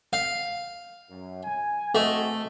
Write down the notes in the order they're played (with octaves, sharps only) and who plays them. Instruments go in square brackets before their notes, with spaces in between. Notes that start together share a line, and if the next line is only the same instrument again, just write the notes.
[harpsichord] F5
[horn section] F#2
G#5
[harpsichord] A3 [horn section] C4 F#4 D#5